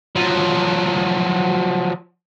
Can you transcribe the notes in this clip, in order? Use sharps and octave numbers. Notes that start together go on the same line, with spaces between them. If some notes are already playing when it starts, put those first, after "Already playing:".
F3 F#3